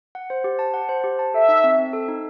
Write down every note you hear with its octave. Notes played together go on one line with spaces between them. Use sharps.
F#5
C5
G4
A5
F#5
C5
G4
A5
A4 E5
D#4
C4
C4
A4
D#4